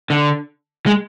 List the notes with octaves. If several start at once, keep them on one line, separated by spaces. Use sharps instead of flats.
D3
G#3